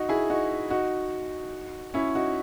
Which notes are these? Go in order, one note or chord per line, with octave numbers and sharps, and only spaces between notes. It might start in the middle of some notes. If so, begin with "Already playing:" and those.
Already playing: D#4 F#4
E4 G#4
D#4 F#4
D#4 F#4
C#4 E4
D#4 F#4